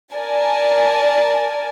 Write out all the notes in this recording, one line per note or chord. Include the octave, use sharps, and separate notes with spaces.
A#4 D5 G#5 A5